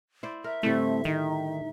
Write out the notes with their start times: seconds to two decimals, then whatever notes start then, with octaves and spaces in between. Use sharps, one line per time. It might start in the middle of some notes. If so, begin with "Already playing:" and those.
0.23 E4 C5 D5
0.44 A#4 E5
0.63 A2 D3 G3 A3 C4
1.05 D#3 D#4